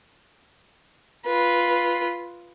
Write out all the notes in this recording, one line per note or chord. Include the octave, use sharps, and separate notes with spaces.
F4 B4